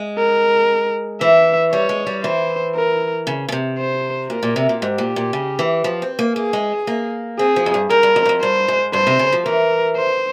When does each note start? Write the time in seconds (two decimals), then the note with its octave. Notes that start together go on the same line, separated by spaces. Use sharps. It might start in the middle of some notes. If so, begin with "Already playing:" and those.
Already playing: G#3
0.18 A#4
1.21 E3 E5
1.72 G3 C#5
1.89 G#3
2.07 G3
2.24 E3 C5
2.75 A#4
3.27 C#3
3.49 C#3
3.52 C3
3.78 C5
4.30 A#2 A#4
4.43 A#2
4.56 C3
4.69 A#2
4.82 G#2 G4
4.98 A#2
5.16 A#2
5.33 C#3
5.59 E3
5.84 F3
6.02 C4
6.19 A#3
6.36 A#3 G#4
6.53 G#3
6.87 A#3
7.38 C4 G#4
7.56 F3
7.66 F2
7.74 G2
7.90 G2 A#4
8.03 G2
8.16 F2
8.25 G2
8.29 F2
8.41 G2 C5
8.68 G#2
8.93 G2 C5
9.07 C3
9.19 C#3
9.32 F3
9.45 E3 A#4
9.97 C5